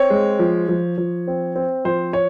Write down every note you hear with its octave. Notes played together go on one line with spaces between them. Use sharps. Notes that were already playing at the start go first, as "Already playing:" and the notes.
Already playing: C4 C#5
G#3
F3
F3
F3
C4
C4
F3 C5
C#5